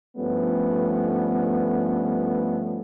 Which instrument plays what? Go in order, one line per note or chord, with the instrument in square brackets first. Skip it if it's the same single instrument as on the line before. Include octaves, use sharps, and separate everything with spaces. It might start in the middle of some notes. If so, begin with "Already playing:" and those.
[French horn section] G2 F3 G3 A3 B3 C#4